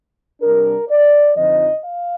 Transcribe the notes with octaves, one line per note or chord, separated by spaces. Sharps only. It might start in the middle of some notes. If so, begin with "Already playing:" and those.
C3 G3 D4 A#4
D5
F2 D3 F3 C4 D#4 D#5
F5